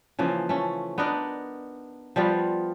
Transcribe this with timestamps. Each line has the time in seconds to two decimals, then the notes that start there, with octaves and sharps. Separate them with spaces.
0.19 C#3 E3 F3 A#3
0.49 A3 C#4
0.98 B3 D4 D#4 A#4
2.16 F3 G3 B3 F4